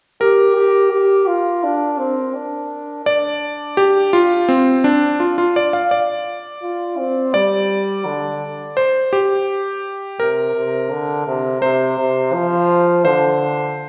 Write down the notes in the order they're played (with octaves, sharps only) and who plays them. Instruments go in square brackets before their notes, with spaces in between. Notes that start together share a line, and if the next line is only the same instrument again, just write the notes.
[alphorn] G4 [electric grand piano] A#4
[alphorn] G4
G4
F4
D4
C4
D4
[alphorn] D4 [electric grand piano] D5
[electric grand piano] G4
F4
C4
D4
F4
F4
D5
F5
D5
[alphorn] F4
C4
[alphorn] G3 [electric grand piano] D5
[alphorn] D3
[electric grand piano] C5
G4
[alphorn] C3 [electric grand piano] A#4
[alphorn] C3
D3
C3
[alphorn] C3 [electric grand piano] C5
[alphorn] C3
F3
[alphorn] D3 [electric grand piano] C5